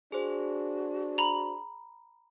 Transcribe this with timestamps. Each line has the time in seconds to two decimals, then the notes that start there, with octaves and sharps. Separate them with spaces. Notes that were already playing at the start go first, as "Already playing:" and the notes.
0.12 D4 F#4 G#4 C5
1.18 A#5 B5 F#7